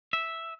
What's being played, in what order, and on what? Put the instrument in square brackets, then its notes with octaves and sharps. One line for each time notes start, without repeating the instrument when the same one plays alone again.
[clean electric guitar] E5